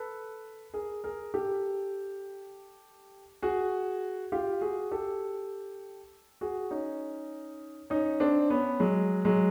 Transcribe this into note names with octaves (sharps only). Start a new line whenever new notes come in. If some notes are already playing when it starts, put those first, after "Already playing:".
Already playing: A4 B4
G#4 A#4
G#4 A#4
G4 A4
F#4 G#4
F4 G4
F#4 G#4
G4 A4
F#4 G#4
C#4 D#4
C#4 D#4
C4 D4
B3 C#4
F#3 G#3
F#3 G#3